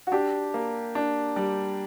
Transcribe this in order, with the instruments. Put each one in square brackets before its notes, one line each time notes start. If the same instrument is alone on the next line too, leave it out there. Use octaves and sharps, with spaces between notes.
[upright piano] F#4
[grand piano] D4 [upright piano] G4
[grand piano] A#3
D4
G3